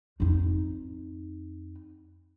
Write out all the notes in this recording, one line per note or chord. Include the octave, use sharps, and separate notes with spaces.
F2 D#4